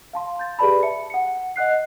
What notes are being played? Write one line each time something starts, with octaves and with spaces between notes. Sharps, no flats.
F5 A5 C6
G6 A6
G4 G#4 B4 D5 A5 B5
E5 A5 C#7
F#5 C#7
D#5 F#5 F#6 C7